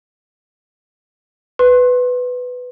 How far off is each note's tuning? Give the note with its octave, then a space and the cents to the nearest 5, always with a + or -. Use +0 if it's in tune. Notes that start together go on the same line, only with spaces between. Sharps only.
B4 +10 C6 +30